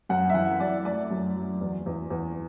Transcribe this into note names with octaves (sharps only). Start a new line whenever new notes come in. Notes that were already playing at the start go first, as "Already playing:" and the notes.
F#2 F#5
E5
E3 F#5
F#2 D5
A3 D5
F#2
F#3
E2
E2
E2